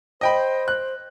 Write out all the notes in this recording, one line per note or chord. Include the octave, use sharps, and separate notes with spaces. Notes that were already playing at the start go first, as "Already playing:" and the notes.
C5 D#5 G5 B5
F#6